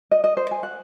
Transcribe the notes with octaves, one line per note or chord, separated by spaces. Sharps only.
D#5
D#5
C5
G#5
F#5